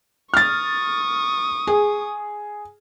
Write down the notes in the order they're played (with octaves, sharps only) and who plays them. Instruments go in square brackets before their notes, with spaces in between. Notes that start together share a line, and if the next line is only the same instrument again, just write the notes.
[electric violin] C#6 D#6 [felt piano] F6 A6
[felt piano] G#4